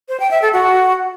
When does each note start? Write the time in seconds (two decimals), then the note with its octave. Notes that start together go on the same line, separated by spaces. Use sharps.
0.09 C5
0.20 G5
0.31 E5
0.42 A4
0.53 F#4